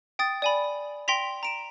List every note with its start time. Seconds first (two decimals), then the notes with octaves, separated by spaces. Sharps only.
0.19 G5 D#6 A6
0.42 D5 G#5 B5
1.08 G5 C6 A#6 B6 F7
1.43 A#5 D7 E7